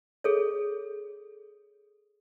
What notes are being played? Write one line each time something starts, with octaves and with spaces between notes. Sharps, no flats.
G#4 A4 C#5